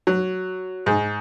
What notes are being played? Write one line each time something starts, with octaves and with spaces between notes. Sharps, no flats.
F#3
G#2